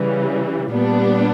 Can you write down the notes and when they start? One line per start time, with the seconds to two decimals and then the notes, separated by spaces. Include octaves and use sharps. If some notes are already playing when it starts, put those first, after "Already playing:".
Already playing: C#3 E3 G3
0.72 A#2 G3 B3 D4